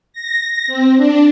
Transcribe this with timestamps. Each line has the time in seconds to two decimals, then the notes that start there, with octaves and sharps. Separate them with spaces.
0.13 A#6
0.67 C4
0.96 D4